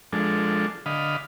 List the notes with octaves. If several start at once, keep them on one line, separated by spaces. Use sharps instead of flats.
F3 G#3 D4 A4
D3 D#5 F5 B5